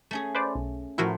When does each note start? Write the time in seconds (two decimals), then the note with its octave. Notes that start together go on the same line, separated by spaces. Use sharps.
0.11 A3 C#4 G#4
0.35 B4 C5 D5
0.55 B1
0.98 A2 F3 A3 E4 F#4 A#4